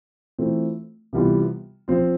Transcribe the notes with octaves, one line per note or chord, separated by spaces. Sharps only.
E3 A3 C4 F4
C3 E3 G3 B3 F4
F3 C4 F4